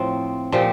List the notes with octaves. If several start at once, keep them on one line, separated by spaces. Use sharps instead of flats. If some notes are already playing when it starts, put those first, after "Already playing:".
Already playing: A2 F3 C4
A#2 F3 C4 G4